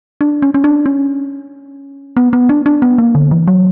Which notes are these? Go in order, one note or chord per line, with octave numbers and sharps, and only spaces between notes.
D4
C#4
C#4
D4
C#4
B3
B3
D4
D4
B3
A#3
D3
E3
F#3